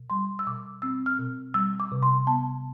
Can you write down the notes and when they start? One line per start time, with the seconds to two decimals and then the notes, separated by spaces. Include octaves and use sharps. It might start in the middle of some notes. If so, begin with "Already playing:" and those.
Already playing: B2
0.10 G3 C6
0.39 E6
0.47 B2 D6
0.82 C4 E6
1.06 F6
1.19 B2
1.54 G3 E6
1.80 D6
1.92 C3
2.03 C6
2.27 B3 A5